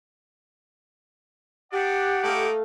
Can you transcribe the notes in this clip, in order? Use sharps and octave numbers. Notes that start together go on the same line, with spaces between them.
B3 D4 G4 D5 F#5
A3 D#4 E4 D5 F5